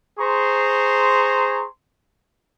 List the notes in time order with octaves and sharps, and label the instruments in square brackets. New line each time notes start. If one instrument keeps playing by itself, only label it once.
[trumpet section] G#4 C5 A#5 C6 C#6